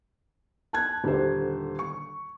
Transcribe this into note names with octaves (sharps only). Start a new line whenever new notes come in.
A5 F#6 G#6
D#1 D3 G4 C5
C#6